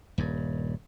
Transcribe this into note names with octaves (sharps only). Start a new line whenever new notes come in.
D#1 G2